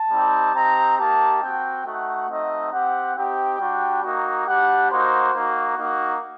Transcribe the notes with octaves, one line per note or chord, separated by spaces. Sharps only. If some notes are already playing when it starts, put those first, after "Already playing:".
Already playing: A5
G3 C4 D#4 G4
C4 D#4 G4 A#5
A#3 D#4 G4 A5
C4 F#4 G5
A3 D#4 F#4 F#5
A3 C4 D#4 F#4 D#5
C4 G4 F#5
C4 D#4 G4 G5
G3 D4 F#4
A#3 D#4 F#4
G3 D4 G4 F#5
A#3 D#4 F#4 C5
A#3 D#4 F#4
A#3 D#4 F#4